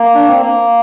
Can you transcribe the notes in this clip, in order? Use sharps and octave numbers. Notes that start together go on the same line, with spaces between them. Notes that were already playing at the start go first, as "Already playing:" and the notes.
Already playing: A#3
D4
C4
A#3